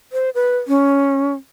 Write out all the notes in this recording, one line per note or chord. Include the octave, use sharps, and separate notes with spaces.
C5
B4
C#4